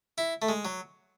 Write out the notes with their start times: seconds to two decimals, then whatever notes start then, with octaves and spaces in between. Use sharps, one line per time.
0.18 E4
0.42 A3
0.49 G#3
0.65 F#3